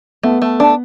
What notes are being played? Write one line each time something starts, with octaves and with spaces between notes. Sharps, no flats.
A3 B3
A3
D4